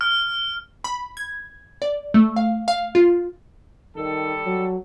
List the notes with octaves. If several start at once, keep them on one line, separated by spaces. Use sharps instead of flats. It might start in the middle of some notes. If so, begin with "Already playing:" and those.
F6
B5
G#6
D5
A3
F5
F5
F4
D#3 G3 A4
F#3